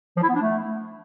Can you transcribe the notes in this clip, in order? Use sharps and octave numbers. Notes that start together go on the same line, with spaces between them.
F3
E4
B3
D4
A3